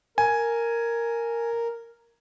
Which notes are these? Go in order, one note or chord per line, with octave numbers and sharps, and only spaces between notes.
A#4 G#5